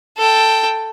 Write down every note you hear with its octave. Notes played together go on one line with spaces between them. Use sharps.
A4 G5